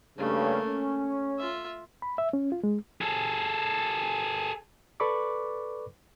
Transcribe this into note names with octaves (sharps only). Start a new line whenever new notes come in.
G2 C#3 A3 A#3
C#4
F4 E5
B5
E5
C#4
F4
G#3
G#4 A4
A4 B4 D5 B5 C#6 D6